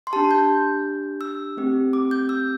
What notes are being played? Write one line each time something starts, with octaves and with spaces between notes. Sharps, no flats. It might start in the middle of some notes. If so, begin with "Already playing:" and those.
C6
D4 G4 A5
G6
E6
A3 C4 G4
D6
G6
E6